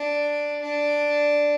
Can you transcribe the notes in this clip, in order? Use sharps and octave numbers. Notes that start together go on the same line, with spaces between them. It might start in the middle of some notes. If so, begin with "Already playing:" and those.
Already playing: D4
D4